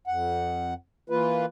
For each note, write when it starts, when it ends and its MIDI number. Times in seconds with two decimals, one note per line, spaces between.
0.07 0.74 41
0.07 0.74 78
1.10 1.46 52
1.10 1.46 58
1.10 1.46 65
1.10 1.46 71